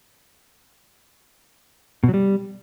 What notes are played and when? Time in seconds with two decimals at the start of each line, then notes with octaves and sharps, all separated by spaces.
2.04 B2
2.09 F#3
2.14 G3